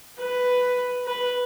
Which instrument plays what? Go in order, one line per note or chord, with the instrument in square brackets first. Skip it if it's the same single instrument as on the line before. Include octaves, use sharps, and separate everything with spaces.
[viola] B4
B4